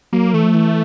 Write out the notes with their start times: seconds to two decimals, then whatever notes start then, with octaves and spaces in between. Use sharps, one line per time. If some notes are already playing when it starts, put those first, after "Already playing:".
0.12 F#3 A#3
0.33 E3 A3
0.44 F3
0.54 E3